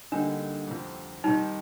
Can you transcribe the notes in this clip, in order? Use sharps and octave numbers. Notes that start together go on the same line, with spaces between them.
D2 D3 G3 A#3 D4 D#4
F2 C3 F3
C3 D#3 G3 D#4